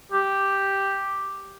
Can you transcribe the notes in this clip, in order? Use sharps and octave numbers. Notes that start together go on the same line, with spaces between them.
G4